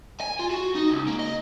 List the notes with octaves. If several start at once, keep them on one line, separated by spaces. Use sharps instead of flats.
G#5
F4
F#4
D#4
C#2
A#3
D#5